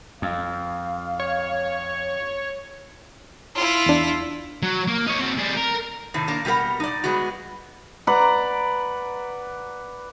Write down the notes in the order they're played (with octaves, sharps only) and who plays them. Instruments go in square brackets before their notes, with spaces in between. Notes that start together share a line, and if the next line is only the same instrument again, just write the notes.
[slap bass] F2 [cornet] F5
[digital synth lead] C#5
[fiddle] E4 F4
[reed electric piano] E2 D4
[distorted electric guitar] F#3
A#3
D#4 C#5
C4 F#4
G3 G#4
A#4
[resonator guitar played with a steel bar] A2 C3 D#3
A#3 D4 A#4
B2 G3 G4 A#4 F#5
D#4 D5
G3 G#3 B3 F#4
[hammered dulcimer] B4 D5 F#5 A#5